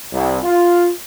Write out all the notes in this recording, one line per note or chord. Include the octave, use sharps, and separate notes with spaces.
C2
F4